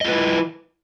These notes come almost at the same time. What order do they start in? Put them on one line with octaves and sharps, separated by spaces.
D#5 F4 B4 E4